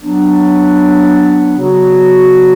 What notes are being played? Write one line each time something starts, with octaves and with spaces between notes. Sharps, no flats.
F#3 B3 D4
C#3 F#3 B3 F#4